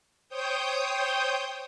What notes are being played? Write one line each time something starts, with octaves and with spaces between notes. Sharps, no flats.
C5 C#5 G5 D#6 G6